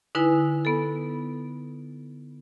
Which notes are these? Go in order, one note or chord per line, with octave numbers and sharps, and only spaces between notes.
D3 D#4 E4 B4 G#5
B3 A4